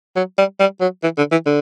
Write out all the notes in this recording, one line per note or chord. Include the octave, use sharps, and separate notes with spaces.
F#3
G3
G3
F#3
E3
D3
E3
D3